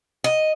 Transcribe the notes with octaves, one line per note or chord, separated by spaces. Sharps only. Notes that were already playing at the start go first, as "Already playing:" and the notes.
D#5